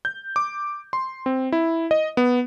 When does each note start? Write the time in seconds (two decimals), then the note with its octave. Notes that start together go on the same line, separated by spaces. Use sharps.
0.05 G6
0.36 D6
0.93 C6
1.26 C4
1.52 E4
1.91 D#5
2.17 B3